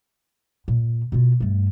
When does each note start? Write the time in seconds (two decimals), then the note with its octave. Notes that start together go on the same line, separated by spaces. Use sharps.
0.68 A#2
1.12 B2 F4
1.40 G2 A3